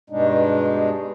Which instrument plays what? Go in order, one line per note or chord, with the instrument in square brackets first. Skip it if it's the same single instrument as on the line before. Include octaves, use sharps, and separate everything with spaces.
[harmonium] G2 B2 G#3 D4 D#4